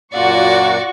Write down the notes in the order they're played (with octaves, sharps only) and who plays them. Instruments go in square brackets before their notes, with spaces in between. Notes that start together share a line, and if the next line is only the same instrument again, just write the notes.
[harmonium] F#2 A#2 A#3 [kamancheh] F4 F#5 [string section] F#4 C#6 [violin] D5